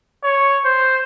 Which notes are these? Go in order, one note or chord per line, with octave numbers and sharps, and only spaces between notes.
C#5
C5